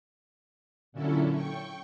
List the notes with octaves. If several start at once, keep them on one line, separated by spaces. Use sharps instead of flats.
A#2 D3 F#3 C#4 E4 A4
G5 C#6